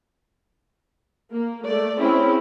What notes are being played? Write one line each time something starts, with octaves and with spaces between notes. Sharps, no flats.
A#3
A3 D5
C4 C#4 E4 G#4